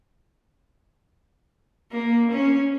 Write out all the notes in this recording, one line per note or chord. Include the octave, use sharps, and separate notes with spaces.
A#3
C#4